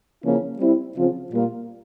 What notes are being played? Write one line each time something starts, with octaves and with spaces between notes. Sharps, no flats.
C#3 F3 A#3 C#4 E4
G3 C4 E4
C#3 F3 C4 F4
A#2 G3 A#3 F4